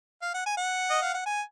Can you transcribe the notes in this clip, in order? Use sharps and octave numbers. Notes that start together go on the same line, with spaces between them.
F5
F#5
G#5
F#5
D#5
F5
F#5
G#5